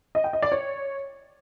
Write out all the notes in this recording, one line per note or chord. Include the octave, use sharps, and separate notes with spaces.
D#5
G5
D#5
D5
C#5